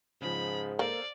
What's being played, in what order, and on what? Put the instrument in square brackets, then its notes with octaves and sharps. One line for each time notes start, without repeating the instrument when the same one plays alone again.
[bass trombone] G#2 [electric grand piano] C#3 F3 [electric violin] B5
[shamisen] A#3 [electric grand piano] A4 C5 F5 [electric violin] D5